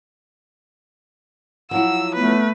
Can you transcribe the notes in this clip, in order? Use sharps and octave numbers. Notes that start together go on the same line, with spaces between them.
F3 F#3 E4 F#5 E6
A3 B3 B4